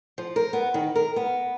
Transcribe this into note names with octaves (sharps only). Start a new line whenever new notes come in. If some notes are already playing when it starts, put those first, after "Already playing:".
F3
A#4
B3
D#3
A#4
B3